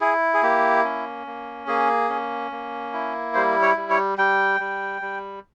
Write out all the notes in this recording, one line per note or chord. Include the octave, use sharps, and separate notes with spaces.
E4 G#4
G#4
A#3 G4
C#4
A#3
A#3 G#4
C#4
A#3
E4
G3 C5
C#5
G3
C#5
G3 G5
G3
G3